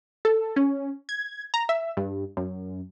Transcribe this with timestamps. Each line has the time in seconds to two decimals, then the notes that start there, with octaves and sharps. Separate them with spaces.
0.25 A4
0.56 C#4
1.09 G#6
1.54 A#5
1.69 E5
1.97 G2
2.37 F#2